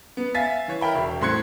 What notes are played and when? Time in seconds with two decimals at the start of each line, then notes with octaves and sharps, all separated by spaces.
0.17 B3
0.34 E5 F5 G#5 A6 B6
0.68 E3 C#5
0.81 A#4 E5 G5 B5
0.95 E1
1.21 A2 C4 C6 F#6 G#6 C#7